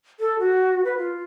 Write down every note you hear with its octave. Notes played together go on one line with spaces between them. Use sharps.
A4
F#4
B4
F4